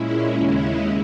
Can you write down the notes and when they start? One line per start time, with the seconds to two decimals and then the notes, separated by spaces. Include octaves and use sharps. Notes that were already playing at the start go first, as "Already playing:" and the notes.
Already playing: A#2 G#3 C#4 E4
0.35 D#2 C#3 G#3 C#4 E4